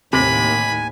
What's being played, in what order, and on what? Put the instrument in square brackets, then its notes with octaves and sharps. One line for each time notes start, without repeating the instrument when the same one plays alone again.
[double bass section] D#2 A2 D#3 [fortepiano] C3 [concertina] G#5 [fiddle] B5